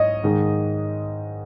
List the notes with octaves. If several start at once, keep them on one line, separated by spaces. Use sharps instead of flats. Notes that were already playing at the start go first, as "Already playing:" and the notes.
Already playing: G#2 C#5 D#5
G#2 D#3 G#3